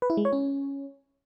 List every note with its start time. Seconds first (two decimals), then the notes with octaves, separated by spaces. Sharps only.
0.02 B4
0.10 E4
0.17 G#3
0.25 C#5
0.33 C#4